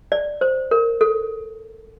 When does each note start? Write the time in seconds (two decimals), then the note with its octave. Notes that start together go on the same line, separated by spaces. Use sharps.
0.12 D5
0.41 C5
0.71 A#4
1.01 A4